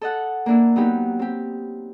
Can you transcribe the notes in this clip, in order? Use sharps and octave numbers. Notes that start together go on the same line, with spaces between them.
A4 D#5 F#5
A#3 D4 E4
F#3 B3 D#4 G4
C4 G4